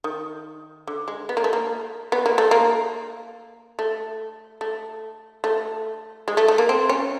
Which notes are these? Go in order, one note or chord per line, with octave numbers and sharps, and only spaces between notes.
D#3
D3
G#3
B3
A#3
A3
A#3
B3
A#3
A3
A#3
A3
A3
A3
G#3
A3
A3
A#3
C4
C#4